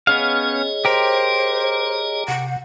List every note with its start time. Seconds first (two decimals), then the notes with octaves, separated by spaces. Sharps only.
0.07 B3 C#4 G#4 C#5 D#5 F5
0.85 G4 A#4 C5
2.28 C3 F#5